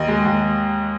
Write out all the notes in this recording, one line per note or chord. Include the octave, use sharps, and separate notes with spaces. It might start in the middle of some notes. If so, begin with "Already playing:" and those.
Already playing: D#2 D#5
G#3
D#2